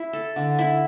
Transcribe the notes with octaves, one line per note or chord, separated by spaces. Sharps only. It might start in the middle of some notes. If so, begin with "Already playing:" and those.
Already playing: E4
A4
D3
E4